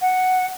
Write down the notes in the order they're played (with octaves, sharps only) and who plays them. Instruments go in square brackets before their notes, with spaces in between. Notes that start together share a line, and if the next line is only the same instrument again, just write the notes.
[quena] F#5